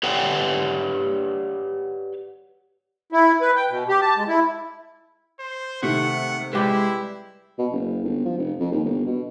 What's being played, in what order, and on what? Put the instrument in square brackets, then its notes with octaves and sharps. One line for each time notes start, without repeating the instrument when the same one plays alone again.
[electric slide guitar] G4 B4 C#5 D5 F#5 G5
[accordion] E4
B4
G5
B2
G4
A5
G#3
E4
[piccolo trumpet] C5
[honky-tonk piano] C3 D#3 [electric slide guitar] A3 [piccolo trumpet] F#5
[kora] G3 G4 B4 [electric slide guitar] G#3 [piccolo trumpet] E4
[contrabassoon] B2
F#1
G1
F3
F1
F2
D#2
G1
B2